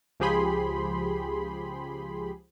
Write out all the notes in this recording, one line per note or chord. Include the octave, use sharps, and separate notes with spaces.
C#2 F3 G4 G#4 B5 C6